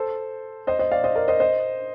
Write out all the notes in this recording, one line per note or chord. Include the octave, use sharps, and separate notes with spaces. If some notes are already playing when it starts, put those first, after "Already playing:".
Already playing: A4 C5
C5 D#5
C5 D#5
D5 F5
C5 D#5
A#4 D5
C5 D#5
C5 D#5